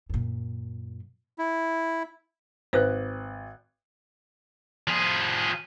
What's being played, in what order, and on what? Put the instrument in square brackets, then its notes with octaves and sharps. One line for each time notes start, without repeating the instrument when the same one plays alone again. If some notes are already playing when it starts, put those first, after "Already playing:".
[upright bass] F#2 A#2
[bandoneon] E4
[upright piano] G#1 F#6 [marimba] B4 C5
[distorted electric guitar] F3 G#4